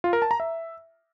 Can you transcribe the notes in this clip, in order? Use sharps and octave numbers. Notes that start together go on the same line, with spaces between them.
F4
A#4
A5
A#5
E5